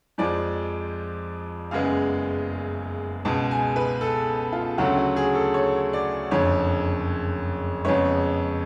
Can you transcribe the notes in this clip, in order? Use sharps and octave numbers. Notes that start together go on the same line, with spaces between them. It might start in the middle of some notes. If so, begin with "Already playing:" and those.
F2 F3 G#3 D5
F#1 F#2 C#3 G#3 B3 F5
C#2 B2 G#3 A5
G#5
B4
A4
F4
D2 C#3 F#3 A3 F#4
F#4
G#4
A4
C#5
D5
F#1 F2 D3 C#5
F2 C#3 G#3 B3 C#5